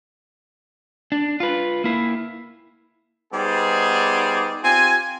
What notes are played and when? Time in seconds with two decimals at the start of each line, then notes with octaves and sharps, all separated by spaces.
1.12 D4
1.40 F4 B4
1.84 A#3 E4
3.33 G3 B3 D#4 G#4 C5 D5
4.63 C4 F4 G4 G#5